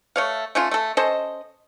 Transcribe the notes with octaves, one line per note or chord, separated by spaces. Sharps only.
A3 C#5 F5
A3 C#4 F4
A3 A4
C#4 A4 C5 D#5